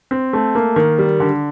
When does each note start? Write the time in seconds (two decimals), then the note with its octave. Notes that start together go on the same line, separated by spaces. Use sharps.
0.11 C4
0.33 A3
0.55 A#3
0.76 D#3
0.98 G3
1.20 D3